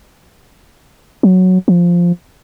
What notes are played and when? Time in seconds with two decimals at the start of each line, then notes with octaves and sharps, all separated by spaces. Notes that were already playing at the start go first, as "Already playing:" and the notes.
1.23 F#3
1.68 F3